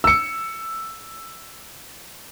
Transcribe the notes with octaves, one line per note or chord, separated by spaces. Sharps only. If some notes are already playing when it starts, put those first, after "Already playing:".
E6 C#7